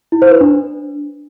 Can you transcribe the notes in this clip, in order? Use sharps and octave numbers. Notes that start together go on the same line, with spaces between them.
E4
C5
B4
D4